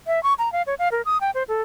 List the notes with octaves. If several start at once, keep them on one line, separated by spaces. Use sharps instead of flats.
E5
C#6
A#5
F5
C#5
F5
A#4
D#6
G5
C5
A4